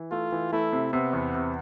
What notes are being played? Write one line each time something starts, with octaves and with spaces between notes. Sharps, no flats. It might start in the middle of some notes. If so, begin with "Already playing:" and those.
Already playing: E3
A3 F4
E3
A3 E4
C3
C3 B3
E2
C3